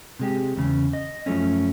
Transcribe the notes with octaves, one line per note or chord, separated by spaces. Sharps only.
C3 G#3 G4
E2 C#3
D#5
F#2 F3 F#3 A3 C#4